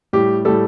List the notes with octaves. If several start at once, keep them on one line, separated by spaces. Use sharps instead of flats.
A2 G3 G4
A2 G3 A4